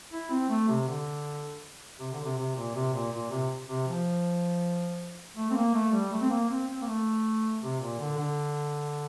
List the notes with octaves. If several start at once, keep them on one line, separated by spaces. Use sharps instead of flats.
E4
C4
A3
C3
D3
C3
D3
C3
C3
A#2
C3
A#2
A#2
C3
C3
F3
A3
C4
A#3
A3
G3
A3
C4
A#3
C4
C4
A#3
A3
C3
A#2
D3
D3